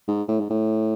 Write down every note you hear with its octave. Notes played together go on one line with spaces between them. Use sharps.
G#2
A2
G#2
A2